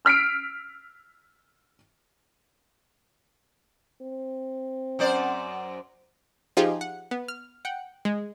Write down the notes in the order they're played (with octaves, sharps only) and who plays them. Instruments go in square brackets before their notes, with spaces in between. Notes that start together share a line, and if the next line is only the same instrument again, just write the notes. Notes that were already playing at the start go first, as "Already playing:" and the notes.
[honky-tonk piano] E6 F6 B6 C7 D7
[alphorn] C4
[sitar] F#2 C5 D5
[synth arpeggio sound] F3 D#4 F4 G4 G#4
F#5
B3
F6
F#5 G5
G#3